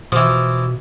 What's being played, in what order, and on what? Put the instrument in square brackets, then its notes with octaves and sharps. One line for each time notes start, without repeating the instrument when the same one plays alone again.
[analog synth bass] B2 [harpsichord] E3 F3